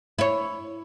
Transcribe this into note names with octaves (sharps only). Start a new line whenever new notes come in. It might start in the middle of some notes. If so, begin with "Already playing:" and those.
E4 C#5